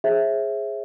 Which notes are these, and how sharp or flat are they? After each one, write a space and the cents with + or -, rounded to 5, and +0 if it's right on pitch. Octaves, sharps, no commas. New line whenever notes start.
G#4 +0 C5 +45 E5 +0